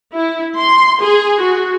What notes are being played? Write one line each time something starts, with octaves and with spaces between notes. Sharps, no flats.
E4
C6
G#4
F#4